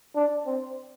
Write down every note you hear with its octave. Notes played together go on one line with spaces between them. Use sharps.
D4
C4